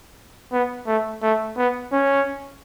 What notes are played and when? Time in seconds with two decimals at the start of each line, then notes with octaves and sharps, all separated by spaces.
0.52 B3
0.87 A3
1.22 A3
1.57 B3
1.92 C#4